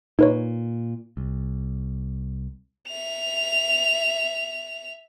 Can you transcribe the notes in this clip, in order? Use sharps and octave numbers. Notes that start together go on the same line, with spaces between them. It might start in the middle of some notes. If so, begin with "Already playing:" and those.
A#2 D#4 B4 C#5
C2
E5 F7